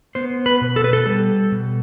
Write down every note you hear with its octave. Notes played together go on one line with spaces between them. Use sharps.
B3 C5
B4
B2
A4
B4
A4
G3 A4
B2